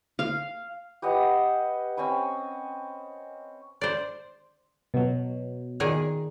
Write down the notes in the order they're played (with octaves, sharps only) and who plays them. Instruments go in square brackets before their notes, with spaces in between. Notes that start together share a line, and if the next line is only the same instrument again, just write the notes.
[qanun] F5
[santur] G4 B4 D#5 F#5
C4 C#4 G#5 B5
[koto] C5 D5
[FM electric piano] B2 F#3
[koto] A#2 D#3 G#4